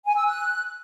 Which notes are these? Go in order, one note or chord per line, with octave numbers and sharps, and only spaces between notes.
G#5
E6
F#6